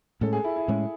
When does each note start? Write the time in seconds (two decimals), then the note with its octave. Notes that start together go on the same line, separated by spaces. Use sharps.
0.21 A2 G#3 C#4 A4
0.33 G#4
0.44 E4
0.56 E4
0.68 A2 G#3 C#4